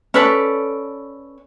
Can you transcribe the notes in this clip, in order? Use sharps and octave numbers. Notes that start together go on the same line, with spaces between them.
C#4 A4 B4 D5